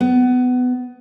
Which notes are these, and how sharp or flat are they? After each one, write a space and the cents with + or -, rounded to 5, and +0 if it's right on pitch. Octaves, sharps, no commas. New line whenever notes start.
B3 +20